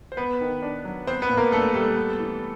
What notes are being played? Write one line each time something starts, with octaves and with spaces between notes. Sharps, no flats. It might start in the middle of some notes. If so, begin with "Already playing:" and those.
C5
B3 B4
D#3
D4
F#3
B3 C4 C5
B3 B4
A#2
A#3 A#4
A3 D4 A4
G3 A3 A4
B3
E3